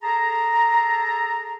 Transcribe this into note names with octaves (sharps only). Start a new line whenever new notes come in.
G#4 A4 A5 A#5